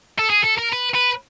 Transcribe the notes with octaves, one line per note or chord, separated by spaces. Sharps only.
A4
G#4
A4
A#4
B4
B4